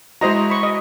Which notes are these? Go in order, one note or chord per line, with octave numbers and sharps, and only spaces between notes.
G#3 E4 F#4 C5 D#5 A#5
B5 C#6
D#5